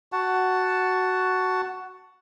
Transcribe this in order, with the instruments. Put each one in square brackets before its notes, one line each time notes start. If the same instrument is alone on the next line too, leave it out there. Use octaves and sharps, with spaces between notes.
[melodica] F#4 F#5 A5